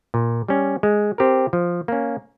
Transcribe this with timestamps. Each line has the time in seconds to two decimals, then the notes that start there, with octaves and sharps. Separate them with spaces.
0.14 A#2
0.48 G3 C#4
0.83 G#3
1.18 C4 G4 A#4
1.53 F3
1.88 A#3 C#4